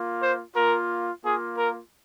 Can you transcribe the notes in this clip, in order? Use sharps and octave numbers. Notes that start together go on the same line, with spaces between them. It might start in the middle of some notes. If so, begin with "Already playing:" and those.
Already playing: A#3 F4
C5
A#3 F4 A#4
A#3 F4 G#4
A#4